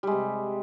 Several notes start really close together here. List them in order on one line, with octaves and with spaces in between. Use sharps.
G3 G#3 C3